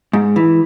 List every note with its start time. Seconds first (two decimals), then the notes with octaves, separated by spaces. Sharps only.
0.13 G#2
0.36 E3